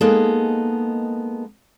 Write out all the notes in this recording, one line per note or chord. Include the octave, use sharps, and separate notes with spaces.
G#3 A#3 B3 D#4 G#4 A4